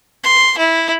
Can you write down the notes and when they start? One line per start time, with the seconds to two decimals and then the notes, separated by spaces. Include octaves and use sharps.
0.23 C6
0.58 E4